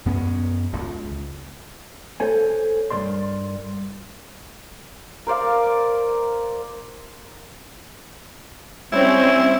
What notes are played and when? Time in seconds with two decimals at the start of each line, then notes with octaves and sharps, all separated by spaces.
0.06 F#2 B3 C#4
0.72 D1 C#2
2.20 A4 C5 C#5 G#5
2.90 G2 F3 A#4 D5 C6
5.27 A#4 C5 D5 F5
8.93 G3 C4 C#4 E4